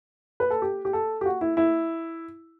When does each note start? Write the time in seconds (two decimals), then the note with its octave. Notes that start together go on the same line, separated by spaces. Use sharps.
0.40 B4
0.50 A4
0.62 G4
0.85 G4
0.93 A4
1.21 G4
1.26 F#4
1.41 E4
1.57 E4